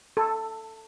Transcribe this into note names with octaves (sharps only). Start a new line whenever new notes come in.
A4